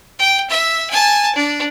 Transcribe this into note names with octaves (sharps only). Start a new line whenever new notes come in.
G5
E5
G#5 A5
D4